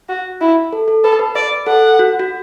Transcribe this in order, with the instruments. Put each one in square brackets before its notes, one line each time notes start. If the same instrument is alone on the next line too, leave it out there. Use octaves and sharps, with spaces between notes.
[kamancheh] F#4
E4
[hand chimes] A4
A4
[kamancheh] A4 [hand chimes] B4
[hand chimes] B4
[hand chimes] B4 [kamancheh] D5
[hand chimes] A4 [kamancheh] F#5
[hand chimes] F#4
F#4